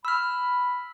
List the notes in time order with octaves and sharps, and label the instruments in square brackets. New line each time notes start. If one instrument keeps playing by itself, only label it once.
[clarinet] B5 [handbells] E6 F6